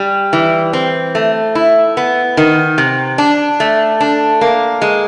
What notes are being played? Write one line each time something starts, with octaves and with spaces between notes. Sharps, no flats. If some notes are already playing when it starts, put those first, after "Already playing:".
Already playing: G3
E3
C4
A3
E4
B3
D#3
C3
D4
A3
D4
A#3
G#3